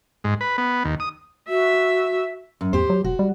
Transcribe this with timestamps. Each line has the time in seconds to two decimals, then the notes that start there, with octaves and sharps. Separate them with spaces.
0.24 G#2
0.41 B4
0.58 B3
0.85 D#2
1.00 D#6
1.49 F#4 E5
2.61 F#2
2.73 E2 G4 C5
2.90 F#3
3.04 E1 F#4
3.19 G3